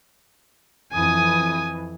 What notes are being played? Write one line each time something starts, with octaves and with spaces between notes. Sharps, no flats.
F2 E3 G#5 D#6